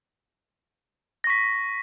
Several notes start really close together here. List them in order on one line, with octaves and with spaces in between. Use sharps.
A#6 C#6 B6